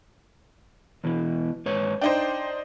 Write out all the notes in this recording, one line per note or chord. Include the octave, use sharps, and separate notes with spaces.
E2 B2 E3
G#2 B4 C#5
D4 D#4 C5 G5